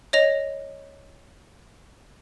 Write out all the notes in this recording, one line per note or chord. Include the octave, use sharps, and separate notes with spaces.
C#5 D#5 A#6 F7